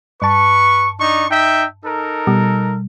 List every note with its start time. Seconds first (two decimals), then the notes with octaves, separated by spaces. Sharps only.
0.22 G2 B4 A5 C#6
1.00 D4 D#4 C#6
1.30 D#4 E5 G5
1.85 D#4 A4 A#4
2.27 B2 G3